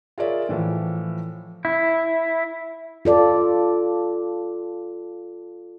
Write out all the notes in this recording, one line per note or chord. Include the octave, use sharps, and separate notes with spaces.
F4 G#4 A#4 C#5 D5 E5
A2 E3 F3
E4
F4 A4 D5